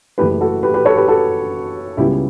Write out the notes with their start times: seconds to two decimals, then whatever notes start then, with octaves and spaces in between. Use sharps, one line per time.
0.18 F#1 F#2 E3 A3 G4 B4
0.41 F#4 A4
0.63 G4 B4
0.74 G4 B4
0.85 A4 C#5
0.96 G4 B4
1.08 F#4 A4
1.97 C#2 C#3 G3 B3 E4 G4